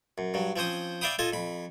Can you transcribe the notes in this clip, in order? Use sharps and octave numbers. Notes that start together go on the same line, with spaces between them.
F#2
G2 F#3
F3 C4 C#4 C5 D#6
D5 E5 F5 G5 B5 D#6
F4 A4 D#5 G#5
F2 B5